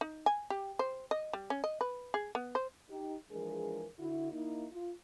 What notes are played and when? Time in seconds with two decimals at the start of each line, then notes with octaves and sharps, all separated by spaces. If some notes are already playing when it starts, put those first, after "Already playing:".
0.01 D#4
0.26 G#5
0.50 G4
0.79 C5
1.11 D#5
1.33 G3
1.50 C#4
1.64 D#5
1.81 B4
2.14 G#4
2.35 B3
2.55 C5
2.90 D#4 G4
3.31 E3 F3 G#3 D4 G#4 A#4
4.00 D3 E4 F#4
4.32 A#3 D#4 E4
4.72 F4